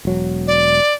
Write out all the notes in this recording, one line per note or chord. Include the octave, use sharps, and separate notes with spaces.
E1 F#3
D5